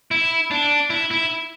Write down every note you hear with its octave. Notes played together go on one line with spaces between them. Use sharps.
E4
D4
E4
E4